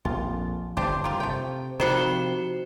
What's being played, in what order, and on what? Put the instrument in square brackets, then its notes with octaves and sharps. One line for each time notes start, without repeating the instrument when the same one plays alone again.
[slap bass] A#1 F2 [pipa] F4
[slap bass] G1 F2 [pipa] D4 G4 C5
[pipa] A#3 F4 G4
[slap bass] C3 [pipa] A3 G5
[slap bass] C3 F3 [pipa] D#3 G3 [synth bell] F#4 C5 E7